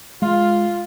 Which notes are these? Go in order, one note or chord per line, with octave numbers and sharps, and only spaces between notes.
G#3 F4